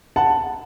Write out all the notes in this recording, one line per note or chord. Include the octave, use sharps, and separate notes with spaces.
F#5 A5